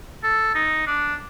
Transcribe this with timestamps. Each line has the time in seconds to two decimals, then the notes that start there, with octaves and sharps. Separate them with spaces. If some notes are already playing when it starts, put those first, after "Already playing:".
0.23 A4
0.55 D#4
0.87 D4